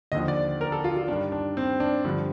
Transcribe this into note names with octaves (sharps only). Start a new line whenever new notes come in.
D#2 D3 F3 D#5
D5
A#4
A4
F4
F4
G2 D#3 D4
D4
C4
D4
G2 D3 F3